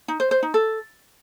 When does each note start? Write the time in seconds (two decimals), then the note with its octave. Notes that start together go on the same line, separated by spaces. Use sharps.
0.08 D#4
0.20 C5
0.31 C5
0.43 D#4
0.54 A4